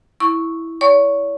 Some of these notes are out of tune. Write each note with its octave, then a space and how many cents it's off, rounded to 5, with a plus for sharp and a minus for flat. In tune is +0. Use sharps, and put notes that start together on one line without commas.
E4 -5 C#6 +0
C#5 +40 C#6 +0